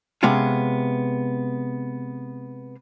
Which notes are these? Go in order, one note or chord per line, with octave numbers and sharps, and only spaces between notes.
C3 G#3 B3 C#4 F4